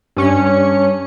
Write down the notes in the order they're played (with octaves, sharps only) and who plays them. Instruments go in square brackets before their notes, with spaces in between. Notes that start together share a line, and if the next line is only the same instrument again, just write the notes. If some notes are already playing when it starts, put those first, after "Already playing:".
[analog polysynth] G2 C#4 C#7